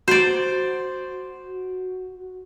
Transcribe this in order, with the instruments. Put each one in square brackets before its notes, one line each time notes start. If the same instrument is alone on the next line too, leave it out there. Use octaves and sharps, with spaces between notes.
[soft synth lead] F#4 [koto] C5 D5